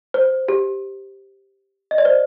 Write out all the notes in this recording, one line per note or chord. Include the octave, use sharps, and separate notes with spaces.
C5
G4
D#5
D5
C5